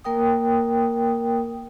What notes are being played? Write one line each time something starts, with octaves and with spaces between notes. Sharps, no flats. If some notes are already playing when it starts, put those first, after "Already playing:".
A#3 A#4 G5 D#6